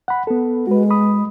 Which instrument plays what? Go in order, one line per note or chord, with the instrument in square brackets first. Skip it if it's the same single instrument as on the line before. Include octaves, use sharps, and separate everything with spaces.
[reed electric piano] F#5 B5
B3 A4
[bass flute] G#3 [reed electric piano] F#4 B4
[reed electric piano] B5 D#6